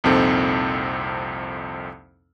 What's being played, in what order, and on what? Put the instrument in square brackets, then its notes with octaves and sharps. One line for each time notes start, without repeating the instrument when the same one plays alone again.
[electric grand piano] C2 F2 A#2 C4 D#4 A4